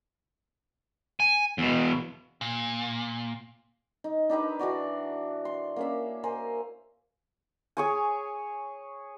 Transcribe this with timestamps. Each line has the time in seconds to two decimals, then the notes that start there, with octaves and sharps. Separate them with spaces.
1.20 G#5
1.58 E2 B2
2.41 A#2
4.04 D#4
4.29 D4 D#4 G4 B4
4.59 E3 D4 F#4 D5
5.45 C6
5.76 A#3 C#4 E5
6.23 A#4 C5 G#5
7.77 G#4 C#5 G#5